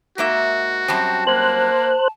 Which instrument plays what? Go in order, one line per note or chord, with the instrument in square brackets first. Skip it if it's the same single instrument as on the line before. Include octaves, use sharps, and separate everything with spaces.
[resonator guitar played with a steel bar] G#2 A#3 E5 [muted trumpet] F#4
[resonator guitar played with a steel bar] F#2 G3 C4 [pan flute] A5
[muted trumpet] A#3 [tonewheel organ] C5 F#6